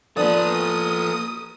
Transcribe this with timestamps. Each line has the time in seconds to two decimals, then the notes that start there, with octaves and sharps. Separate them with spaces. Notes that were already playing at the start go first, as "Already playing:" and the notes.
0.17 F3 A#3 B3 D4 A4 B4 D#6